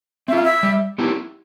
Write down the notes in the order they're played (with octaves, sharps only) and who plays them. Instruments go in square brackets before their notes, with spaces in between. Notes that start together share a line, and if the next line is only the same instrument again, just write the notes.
[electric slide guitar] C4 [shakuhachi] E5
[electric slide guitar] F4 [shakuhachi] F5
[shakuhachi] E5
[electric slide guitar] G3
B3 E4 G4